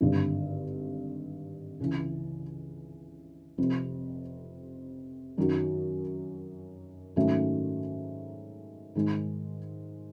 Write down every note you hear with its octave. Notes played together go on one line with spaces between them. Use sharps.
G#1 G2 D3
C#2 C#3 E3
F1 F2 C3
F#2 D#3 F#3
G#2 D#3 F#3 A3 C#4
G#2 D#3 G#3